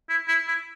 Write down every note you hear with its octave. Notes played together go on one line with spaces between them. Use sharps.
E4
E4
E4